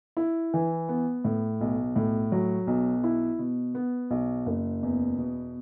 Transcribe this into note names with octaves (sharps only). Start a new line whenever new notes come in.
E4
E3
B3
A2
B1
A2
F#3
B1
E4
B2
B3
B1
F#1
E2
B2